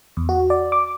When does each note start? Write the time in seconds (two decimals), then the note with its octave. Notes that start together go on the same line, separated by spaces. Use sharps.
0.17 E2
0.29 F#4
0.50 D5
0.72 D6